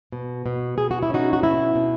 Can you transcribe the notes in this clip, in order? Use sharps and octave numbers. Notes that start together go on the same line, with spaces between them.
B2
B2
B2 G#4
F#4
E4
C#4 D#4 F#4
F#4
B2 E4
B2